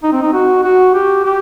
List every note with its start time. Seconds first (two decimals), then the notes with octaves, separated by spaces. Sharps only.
0.03 D#4
0.12 C4
0.22 D#4
0.33 F#4
0.63 F#4
0.94 G4
1.24 G4